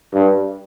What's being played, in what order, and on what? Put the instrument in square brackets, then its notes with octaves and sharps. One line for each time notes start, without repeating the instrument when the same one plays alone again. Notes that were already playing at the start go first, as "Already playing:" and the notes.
[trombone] G2